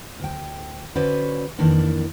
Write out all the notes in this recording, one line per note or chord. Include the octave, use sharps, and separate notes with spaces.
D2 G5
D3 C#4 F#4 B4 C5 D5
F2 D#3 E3 A#3 D4